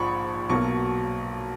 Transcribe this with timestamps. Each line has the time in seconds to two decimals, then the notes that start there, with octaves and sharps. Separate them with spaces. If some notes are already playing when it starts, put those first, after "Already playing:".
Already playing: A#1 G#2 F3 B5 C#6
0.49 B1 B2 F#3 A#3 C#6